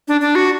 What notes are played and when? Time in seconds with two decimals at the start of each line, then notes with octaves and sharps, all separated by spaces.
0.08 D4
0.21 D4
0.35 F#4